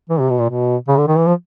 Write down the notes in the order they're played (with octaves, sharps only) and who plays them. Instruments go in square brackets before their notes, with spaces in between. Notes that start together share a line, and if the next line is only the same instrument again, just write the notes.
[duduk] E3
C3
B2
A#2
B2
C#3
D3
D#3
E3
F3